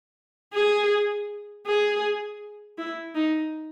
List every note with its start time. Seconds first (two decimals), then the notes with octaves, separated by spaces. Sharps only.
0.54 G#4
1.66 G#4
2.78 E4
3.15 D#4